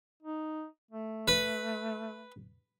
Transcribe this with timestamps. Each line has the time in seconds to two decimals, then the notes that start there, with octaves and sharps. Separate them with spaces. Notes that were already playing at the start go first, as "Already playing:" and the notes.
0.23 D#4
0.91 A3
1.28 B4